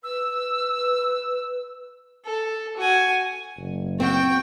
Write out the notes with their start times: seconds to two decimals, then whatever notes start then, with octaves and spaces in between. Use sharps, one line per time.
0.04 B4 E6
2.25 A4
2.77 F#4 G#5
3.58 F#1
4.00 C4 F#4 G5